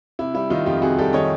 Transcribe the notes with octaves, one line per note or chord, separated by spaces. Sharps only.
C3 E4
G3 E4
D#3 D#4 F4
F2 F4 G4
C3 F#4 G#4
G3 G4 A4
D#3 C#5 D#5